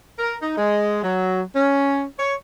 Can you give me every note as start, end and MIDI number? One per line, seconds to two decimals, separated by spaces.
0.19 0.35 70
0.41 0.52 63
0.57 0.99 56
1.02 1.42 54
1.55 2.03 61
2.19 2.34 73